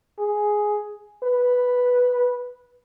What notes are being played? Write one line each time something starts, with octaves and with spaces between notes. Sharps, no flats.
G#4
B4